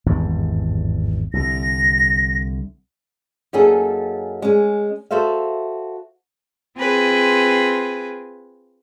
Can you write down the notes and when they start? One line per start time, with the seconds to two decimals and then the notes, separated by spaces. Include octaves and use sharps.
0.06 G#1 E2 G2
1.33 C2 D3 A#6
3.53 F#2 A#3 C#4 D#4 G#4 A4
4.42 G#3 C#4
5.11 F#4 A4 C5 E5 F5
6.78 C4 F4 G#4 B4